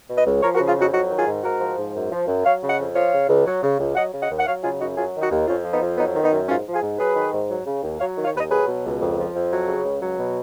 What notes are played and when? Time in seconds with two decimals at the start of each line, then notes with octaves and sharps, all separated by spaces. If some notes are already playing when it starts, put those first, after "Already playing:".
0.08 B2
0.17 B4 D#5
0.26 C#2
0.42 F3 A#4 C#5
0.55 F#4 A#4
0.59 C#3
0.67 F4 G#4
0.77 F2 D#4 F#4
0.92 F#3 D#4 F#4
1.10 D#3
1.18 F4 G#4
1.26 G#2
1.43 G#2 F#4 A#4
1.60 F3
1.77 G#2
1.94 F#2
2.11 F3
2.27 F#2
2.44 F#3 C#5 F5
2.61 C#3
2.69 D#5 F#5
2.77 F2
2.94 F3 C#5 F5
3.11 C#3
3.28 C#2
3.46 F#3
3.63 C#3
3.79 C#2
3.95 F#3 D#5 F#5
4.12 C#3
4.21 D#5 F#5
4.30 D#2
4.38 F#5
4.46 F#3 C#5 F5
4.63 C#3 F4 G#4
4.79 F#2 D#4 F#4
4.96 F#3 F4 G#4
5.14 D#3
5.22 D#4 F#4
5.31 D#2
5.47 F2 C#4 F4
5.63 F3
5.72 B3 D#4
5.81 F2
5.97 F#3 B3 D#4
6.14 D#3
6.22 B3 D#4
6.31 F#2
6.48 G#2 C#4 F4
6.66 F3
6.73 F4 G#4
6.82 G#2
6.98 F#3 G#4 B4
7.15 D#3
7.32 G#2
7.49 F#3
7.65 C#3
7.82 D#2
7.99 F#3 C#5 F5
8.16 D#3
8.25 C#5 F5
8.34 D#2 B4 D#5
8.50 F#3 G#4 B4
8.67 B2
8.83 C#2
9.00 F2
9.18 F3
9.34 F2
9.51 F#3
9.68 C#3
9.84 C#2
10.01 F#3
10.18 B2